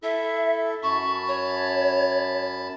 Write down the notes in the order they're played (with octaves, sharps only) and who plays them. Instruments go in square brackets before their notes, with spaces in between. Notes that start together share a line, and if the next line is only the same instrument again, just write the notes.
[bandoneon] E4 A4 [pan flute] E5
[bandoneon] F#2 A5 B5 [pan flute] C#6
[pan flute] C#5